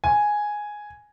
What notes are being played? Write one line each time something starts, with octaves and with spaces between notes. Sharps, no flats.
G#5